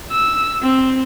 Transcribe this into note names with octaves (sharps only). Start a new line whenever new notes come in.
E6
C4